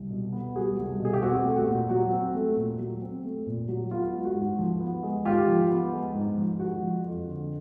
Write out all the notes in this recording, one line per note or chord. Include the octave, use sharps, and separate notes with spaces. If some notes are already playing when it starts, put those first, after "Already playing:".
Already playing: C2
B2
B3
G3 F#4 G#4
C2
B2
G#4
G4
C4 F#4
A3
F#4
A#2
F#3 F#4
C4
A3
A#2
F#3
C4
A3
A#2
F#3
B3 F4
G#3
F#4
G#2
F3
B3
G#3
G#2 F4 G4
F3
B3
G#3
G#2
F3
G#3 F#4
F3
F2
D3